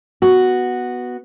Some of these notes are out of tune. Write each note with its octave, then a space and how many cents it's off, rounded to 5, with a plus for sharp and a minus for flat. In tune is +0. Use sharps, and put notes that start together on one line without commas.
B3 +0 F#4 +0